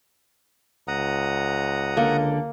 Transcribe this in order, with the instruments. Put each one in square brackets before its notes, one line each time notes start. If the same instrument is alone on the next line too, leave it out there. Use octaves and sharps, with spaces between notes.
[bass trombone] C#2 [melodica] F#5 A#5 D#6
[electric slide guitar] D3 A4 [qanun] A#3